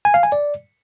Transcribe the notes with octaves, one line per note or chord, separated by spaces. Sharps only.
G#5
F5
G#5
D5